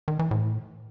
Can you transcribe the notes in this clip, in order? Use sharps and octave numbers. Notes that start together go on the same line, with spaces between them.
D#3
E3
A2